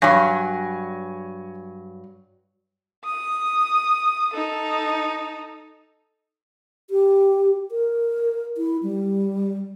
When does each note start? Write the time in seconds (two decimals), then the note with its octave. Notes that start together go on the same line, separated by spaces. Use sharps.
0.02 G2 F#3 C#5 G#5 A#6
3.04 D#6
4.33 D#4 A4
6.90 G4
7.71 A#4
8.57 E4
8.83 G3